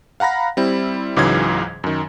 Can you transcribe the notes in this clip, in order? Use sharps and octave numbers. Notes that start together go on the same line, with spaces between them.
F5 F#5 A#5 B5 A#6
G3 C4 E4
C#2 G#2 C#3 E3 F#3 G#6
F#2 D#3